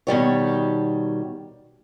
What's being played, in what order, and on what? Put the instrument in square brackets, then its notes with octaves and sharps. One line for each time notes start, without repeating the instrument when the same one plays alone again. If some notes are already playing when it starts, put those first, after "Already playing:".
[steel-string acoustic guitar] B2 D#3 G3 C#5